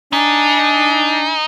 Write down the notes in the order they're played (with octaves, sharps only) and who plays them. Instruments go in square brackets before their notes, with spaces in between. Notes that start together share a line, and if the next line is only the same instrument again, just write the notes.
[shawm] D4 [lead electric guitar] D#4 [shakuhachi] G#5